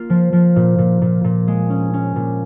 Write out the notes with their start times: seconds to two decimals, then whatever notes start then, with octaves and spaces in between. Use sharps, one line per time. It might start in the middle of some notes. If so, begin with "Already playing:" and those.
Already playing: A#3 F4
0.10 F3
0.33 F3
0.56 A#2
0.78 A#2
1.02 A#2
1.24 A#2
1.48 G#3
1.70 C#4
1.93 C#4
2.16 A#2